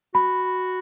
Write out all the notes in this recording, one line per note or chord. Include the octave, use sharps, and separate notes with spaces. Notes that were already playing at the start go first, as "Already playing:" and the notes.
F#4 B5